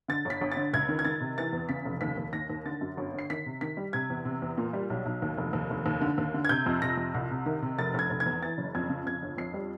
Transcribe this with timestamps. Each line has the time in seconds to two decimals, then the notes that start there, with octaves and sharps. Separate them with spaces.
0.08 D3 A6
0.25 G1
0.30 B6
0.41 G1
0.52 D3 A6
0.73 C#2 G#6
0.89 D#3
0.99 G#6
1.05 D#3 A6
1.21 C3
1.38 E3 A6
1.53 E2
1.69 C#3 B6
1.85 F1
2.01 D#2 B6
2.17 D#2
2.33 D#2 A#6
2.50 D#2
2.65 D3 A6
2.81 F#2
2.97 G1
3.14 D3
3.19 C7
3.30 D#3 B6
3.46 C3
3.61 D#3 B6
3.77 G3
3.93 C3 G#6
4.10 E2
4.25 C3
4.42 E2
4.57 A#2
4.73 G3
4.90 B1
5.06 B1
5.22 D#2
5.38 F1
5.53 D#2
5.70 F1
5.86 D#2
6.01 D3
6.18 D#2
6.34 D3
6.45 G#6
6.49 C3 G6
6.66 F2
6.82 C3 A#6
6.97 F2
7.14 C2
7.31 C3
7.46 D#3
7.62 C3
7.78 F1 A6
7.94 F1 G#6
8.10 F1
8.20 G#6
8.26 E2
8.43 E3 A6
8.58 F#1
8.75 F2 G#6
8.90 C#3
9.06 F2 G#6
9.22 G1
9.38 F2 C7
9.54 G3